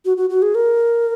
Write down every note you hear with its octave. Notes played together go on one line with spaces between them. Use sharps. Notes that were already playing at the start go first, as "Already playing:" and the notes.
F#4
F#4
F#4
G#4
A#4